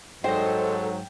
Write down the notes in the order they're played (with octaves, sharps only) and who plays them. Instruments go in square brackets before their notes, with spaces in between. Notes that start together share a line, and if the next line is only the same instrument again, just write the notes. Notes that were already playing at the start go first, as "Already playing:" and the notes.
[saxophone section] G#2 F#3 [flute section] A4 [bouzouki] C5 D#5 [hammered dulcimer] G5